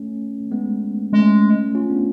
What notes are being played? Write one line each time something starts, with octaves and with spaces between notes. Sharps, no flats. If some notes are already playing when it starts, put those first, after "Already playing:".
Already playing: A3 C#4
G#3 B3
G#3 A3 C#4
C#4 F4
B3 D4